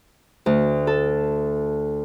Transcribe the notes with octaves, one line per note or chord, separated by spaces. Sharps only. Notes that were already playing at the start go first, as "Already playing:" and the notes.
D2
A4